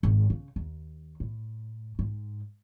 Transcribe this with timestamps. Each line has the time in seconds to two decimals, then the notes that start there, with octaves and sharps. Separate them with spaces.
0.03 G#1
0.30 C#3
0.56 D#2
1.20 A2
1.99 G#2